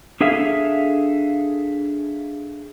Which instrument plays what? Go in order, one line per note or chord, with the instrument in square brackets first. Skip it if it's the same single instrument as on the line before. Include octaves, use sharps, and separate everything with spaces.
[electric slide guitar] D4 G#4 A4 E5 F5